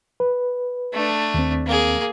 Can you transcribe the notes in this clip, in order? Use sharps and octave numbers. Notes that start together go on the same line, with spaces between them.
B4
A3 D4
D#2 C4
A#3 G#4